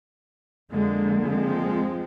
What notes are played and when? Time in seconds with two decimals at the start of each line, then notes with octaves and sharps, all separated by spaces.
0.71 F2 D3 G#3 A#3
1.21 F3 G#3 C4